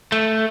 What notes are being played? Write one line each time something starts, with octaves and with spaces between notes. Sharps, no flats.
A3